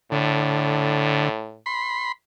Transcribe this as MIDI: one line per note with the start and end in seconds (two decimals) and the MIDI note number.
0.12 1.58 45
0.12 1.29 50
1.66 2.12 83
1.66 2.12 84